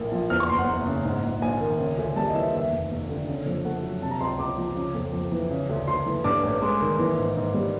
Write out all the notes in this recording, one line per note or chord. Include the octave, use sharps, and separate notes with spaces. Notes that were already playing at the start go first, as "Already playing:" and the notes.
Already playing: A#1 A2 A#3
F3
E2 F6
C#6
F#1 C6
F#5
F#1
C#3
G#2
A#1
A#1 G#5
D#3
C#3
D2
G3 A5
D#5
E3 E5
D#5
D#2 E5
F1
F1
D3
C#3
F2
A3 F#5
F#3
C3 A5
A#5
C#2 C6
C#2 D6
F3
C#3
F2
F2
E3
C#3
D2
D2 C6
E3
G2 D6
A1
G#3
D#3
E3
G#2
G#2
G3